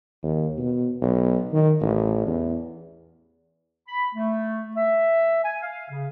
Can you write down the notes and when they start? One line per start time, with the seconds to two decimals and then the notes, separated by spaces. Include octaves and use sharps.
0.23 D#2
0.58 B2
1.02 B1
1.52 D#3
1.81 A1
2.27 E2
3.88 B5
4.15 A3
4.75 E5
5.43 G#5
5.62 F5
5.90 C#3